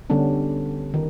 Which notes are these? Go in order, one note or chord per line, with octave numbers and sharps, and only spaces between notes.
D3 G3 B3 C#4 D4
D#3